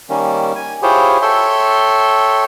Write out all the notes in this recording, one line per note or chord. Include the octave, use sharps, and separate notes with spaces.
D#3 G3 A#3 C#4
G#5
E4 F4 G4 G#4 C5 C#5
A4 C#5 E5 G5 C6